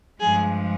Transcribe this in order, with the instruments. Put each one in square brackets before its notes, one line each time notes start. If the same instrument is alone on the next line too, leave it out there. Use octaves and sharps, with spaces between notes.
[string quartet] G2 F3 G#3 G#4